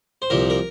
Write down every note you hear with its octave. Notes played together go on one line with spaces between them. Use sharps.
C5
C2 A#2 F3 A#4
A#4